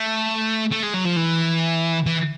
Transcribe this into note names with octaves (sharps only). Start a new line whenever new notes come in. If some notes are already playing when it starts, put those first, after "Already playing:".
Already playing: A3
A3
G#3
F#3
F3
E3
E3